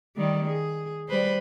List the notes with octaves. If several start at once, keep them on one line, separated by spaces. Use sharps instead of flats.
D#3 G3
G#4
G3 B4 C5